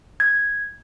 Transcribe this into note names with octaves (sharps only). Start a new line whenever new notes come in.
G#6